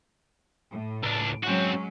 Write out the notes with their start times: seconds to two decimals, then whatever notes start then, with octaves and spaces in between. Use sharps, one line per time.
0.72 A2
1.03 C#2 D4
1.44 F#3 G#3 C4 C#4 F#4